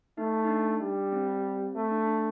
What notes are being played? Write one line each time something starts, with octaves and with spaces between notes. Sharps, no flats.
A3 D#4
D#4
D4
G3
C4
A3
D4
D4